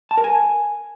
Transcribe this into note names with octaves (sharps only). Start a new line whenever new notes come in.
A5
A#4
G#5